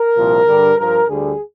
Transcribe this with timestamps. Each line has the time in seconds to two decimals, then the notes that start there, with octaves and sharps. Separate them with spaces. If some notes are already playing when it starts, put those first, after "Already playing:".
Already playing: A#4
0.16 C2 A#2 F3
0.47 G2 D3 G3
0.78 G2 F3 A#4
1.08 D2 D3 G3 G#4